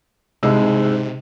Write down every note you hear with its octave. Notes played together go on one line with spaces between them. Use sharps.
C2 G#2 C3 G#3 E6